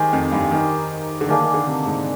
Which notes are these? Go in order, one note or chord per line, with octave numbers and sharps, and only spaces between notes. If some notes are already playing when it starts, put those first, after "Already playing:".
Already playing: D#3 G#3 D#4 G4 C5
F2
G2
D#3 D#4 G4 A#4
D3
D#3 A#3 D4 G#4 D5
D#3
D3
C3
G#2